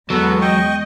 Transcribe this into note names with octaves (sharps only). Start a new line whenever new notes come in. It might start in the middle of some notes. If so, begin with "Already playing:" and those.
E2 F#3 G#3 B3 A4
D#5 G5 C#6